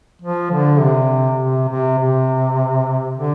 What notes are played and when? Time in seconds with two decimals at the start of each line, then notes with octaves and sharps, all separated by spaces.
0.22 F3
0.51 D3
0.80 C3
1.40 C3
1.69 C3
1.99 C3
3.17 D3